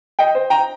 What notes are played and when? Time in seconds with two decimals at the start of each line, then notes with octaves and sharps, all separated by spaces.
0.19 D#5 G5
0.35 C5
0.50 G5 A#5